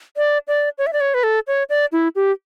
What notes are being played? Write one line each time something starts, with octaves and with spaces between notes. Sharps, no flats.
D5
D5
C#5
E5
D5
C#5
B4
A4
C#5
D5
E4
G4